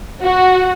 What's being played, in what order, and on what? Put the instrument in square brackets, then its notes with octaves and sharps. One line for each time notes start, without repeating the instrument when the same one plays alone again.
[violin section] F#4